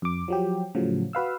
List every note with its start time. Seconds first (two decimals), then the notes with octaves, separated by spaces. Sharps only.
0.02 F2 D6
0.28 F3 F#3 G4
0.75 A2 C#3 F3 F#3
1.13 F#4 B4 F5 E6